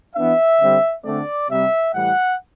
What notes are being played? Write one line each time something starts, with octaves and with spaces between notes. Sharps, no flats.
E3 B3 D4 E5
D3 G3 C4
D3 A3 C4 D5
C3 G3 C4 E5
A2 E3 G3 F#5